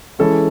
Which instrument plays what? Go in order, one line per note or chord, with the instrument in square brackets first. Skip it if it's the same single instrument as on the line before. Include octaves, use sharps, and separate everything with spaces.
[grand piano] E3 G#3 C#4 E4 A4